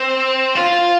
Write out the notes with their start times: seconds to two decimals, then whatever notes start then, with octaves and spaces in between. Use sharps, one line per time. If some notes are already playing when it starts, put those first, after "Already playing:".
Already playing: C4
0.56 F4